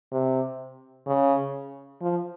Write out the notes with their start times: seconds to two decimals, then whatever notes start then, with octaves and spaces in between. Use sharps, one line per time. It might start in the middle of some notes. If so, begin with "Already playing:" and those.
0.12 C3
1.07 C#3
2.02 F3